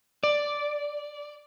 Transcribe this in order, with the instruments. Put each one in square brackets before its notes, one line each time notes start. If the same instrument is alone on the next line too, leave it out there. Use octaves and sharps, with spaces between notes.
[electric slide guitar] D5